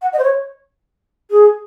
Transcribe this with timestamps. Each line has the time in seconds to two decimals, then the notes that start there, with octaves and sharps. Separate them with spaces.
0.02 F#5
0.13 D#5
0.19 C5
0.23 C#5
1.30 G#4